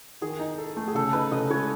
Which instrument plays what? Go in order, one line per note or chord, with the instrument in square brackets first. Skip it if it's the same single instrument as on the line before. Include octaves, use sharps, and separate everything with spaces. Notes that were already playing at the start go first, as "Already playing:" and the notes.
[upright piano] D#3 [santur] G#4
[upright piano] D#4
A4
A3
[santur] G#4
[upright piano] C#3 [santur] A4
[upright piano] D#4 [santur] B4
[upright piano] C#3 [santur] D#5
[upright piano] G#3 [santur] C#5